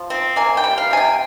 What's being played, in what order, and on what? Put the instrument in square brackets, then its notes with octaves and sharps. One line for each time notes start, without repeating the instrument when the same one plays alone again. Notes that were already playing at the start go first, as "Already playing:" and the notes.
Already playing: [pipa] F3
C4
A#3 G#5
G5
G3
F5
C3 G#5
G5